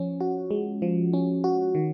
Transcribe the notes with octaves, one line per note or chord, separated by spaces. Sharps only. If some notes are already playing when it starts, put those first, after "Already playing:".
Already playing: F3 C#4
F#4
G#3
F3
C#4
F#4
D#3